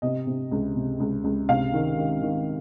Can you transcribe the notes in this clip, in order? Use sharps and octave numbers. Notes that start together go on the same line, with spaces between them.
C3 D#5
C3
C#2
C3
C#2
C#2
C3 F5
D#3
D#3
D#3